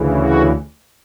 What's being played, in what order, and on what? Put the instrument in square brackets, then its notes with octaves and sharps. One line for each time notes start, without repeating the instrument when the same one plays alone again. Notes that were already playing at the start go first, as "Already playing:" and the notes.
Already playing: [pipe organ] D2 C#3 E3
F#4